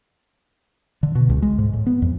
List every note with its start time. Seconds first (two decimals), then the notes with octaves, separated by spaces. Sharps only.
1.03 D3
1.15 B2
1.29 C#2
1.42 G#3
1.58 G#2
1.73 A2
1.86 B3
2.02 F2